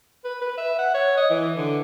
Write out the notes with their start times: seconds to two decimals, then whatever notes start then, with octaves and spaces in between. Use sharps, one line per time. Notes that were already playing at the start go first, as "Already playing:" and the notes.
0.24 B4
0.41 B4
0.57 E5
0.78 F#5
0.94 C#5
1.17 D#5
1.30 E3
1.57 D3